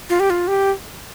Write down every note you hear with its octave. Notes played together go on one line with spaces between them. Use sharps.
F4
G4
F4
G4